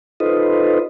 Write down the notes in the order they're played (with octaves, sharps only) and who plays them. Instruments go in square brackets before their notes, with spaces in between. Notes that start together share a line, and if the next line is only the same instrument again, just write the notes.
[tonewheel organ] D#4 F4 A4 B4 C5 D#5